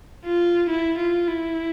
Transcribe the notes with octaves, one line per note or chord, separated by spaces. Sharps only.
F4
E4
F4
E4